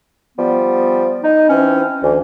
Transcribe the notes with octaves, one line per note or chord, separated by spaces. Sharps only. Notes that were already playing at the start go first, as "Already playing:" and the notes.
F3 G3 B3
D#4
E3 C4 C#4
D2 E3